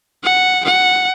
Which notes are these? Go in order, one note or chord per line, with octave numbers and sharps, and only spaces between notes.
F#5
F#5